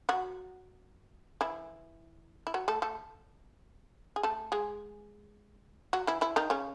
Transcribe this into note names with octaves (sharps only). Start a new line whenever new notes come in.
F#3 F#4
E3 E4
E4
F#3 F#4
A3 A4
A3 A4
G#4
A3 A4
G#3 G#4
F#3 F#4
E3 E4
E3 E4
D#3 D#4
C#3 C#4